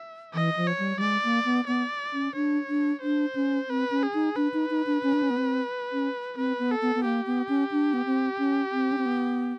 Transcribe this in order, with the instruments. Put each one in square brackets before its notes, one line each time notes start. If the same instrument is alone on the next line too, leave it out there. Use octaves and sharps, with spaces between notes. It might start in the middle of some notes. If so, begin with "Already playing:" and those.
Already playing: [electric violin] E5
[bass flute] E3 [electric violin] D#5
[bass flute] F3
[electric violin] C#5
[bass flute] G3
G3
[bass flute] G#3 [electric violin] D5
[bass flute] A#3
B3
[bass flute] B3 [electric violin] D5
[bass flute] C#4
[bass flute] D4 [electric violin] C#5
[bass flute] D4
[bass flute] D4 [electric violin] C5
[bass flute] C#4
[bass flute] C4 [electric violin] B4
[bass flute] C#4
[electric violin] G#4
[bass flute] D#4
[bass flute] D4 [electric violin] B4
[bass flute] D#4
D#4
D4
C#4
D4
C#4
B3
C4
C#4
[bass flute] C4 [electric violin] B4
[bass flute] B3
[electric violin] A4
[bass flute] B3
B3
[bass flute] A#3 [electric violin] G4
[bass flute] B3
C#4
D4
B3
C4
C#4
C4
C#4
C4
B3